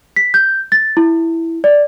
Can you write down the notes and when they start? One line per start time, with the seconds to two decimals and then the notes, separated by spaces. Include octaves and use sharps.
0.16 B6
0.34 G6
0.72 A6
0.97 E4
1.64 D5